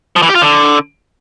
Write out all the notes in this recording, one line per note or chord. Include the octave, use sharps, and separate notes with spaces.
F3
E3
G4
F4
D3